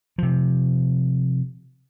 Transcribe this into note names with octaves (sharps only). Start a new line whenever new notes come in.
C3 F3